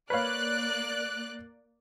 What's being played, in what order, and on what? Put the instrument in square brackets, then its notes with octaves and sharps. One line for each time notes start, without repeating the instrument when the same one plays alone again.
[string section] A#3 D5 F#6 [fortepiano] B4 C#5 F5